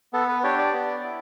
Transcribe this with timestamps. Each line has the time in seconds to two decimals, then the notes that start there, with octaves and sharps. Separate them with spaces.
0.13 B3 A4
0.28 B4
0.44 D4 G4 C#5
0.58 D5
0.73 B3
1.03 E4